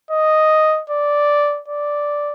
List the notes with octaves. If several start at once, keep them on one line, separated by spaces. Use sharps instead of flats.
D#5
D5
D5